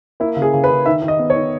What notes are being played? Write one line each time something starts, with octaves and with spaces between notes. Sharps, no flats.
A#3 E4
C#3
G#4
C#3
B4
C#3
D#3 E5
D#3
D#5
B3
C#5
D#3